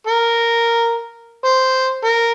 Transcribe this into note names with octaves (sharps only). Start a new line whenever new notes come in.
A#4
C5
A#4